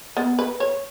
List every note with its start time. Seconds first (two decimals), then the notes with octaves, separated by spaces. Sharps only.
0.17 B3
0.39 B4
0.60 C#5